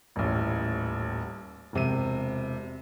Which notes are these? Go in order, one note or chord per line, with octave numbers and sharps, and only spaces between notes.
D#1 A1
E1 C3 D#7